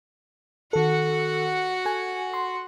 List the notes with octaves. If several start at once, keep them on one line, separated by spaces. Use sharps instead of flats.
D#3 F#4 A4 F#5
A4 G#5
C6